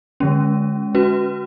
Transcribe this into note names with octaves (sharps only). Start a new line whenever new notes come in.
D3 G#3 C#4
C#4 F#4 B4